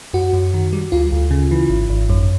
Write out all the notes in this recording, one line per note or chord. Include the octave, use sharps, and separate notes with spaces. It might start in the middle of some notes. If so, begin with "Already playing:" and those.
F#2 F#4
F#2
D#3
G3
D2 F4
D2
C#3
E3
G#1
G#1
F#2